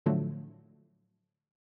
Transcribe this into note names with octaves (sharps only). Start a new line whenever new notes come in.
A2 D3 F3 F#3 A3